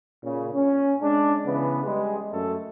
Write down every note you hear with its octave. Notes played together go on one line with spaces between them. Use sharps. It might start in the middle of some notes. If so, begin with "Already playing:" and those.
A#2 C#3
C#4
G#3 D4
C#3 E3 B3
G3 G#3
F#2 A3 A4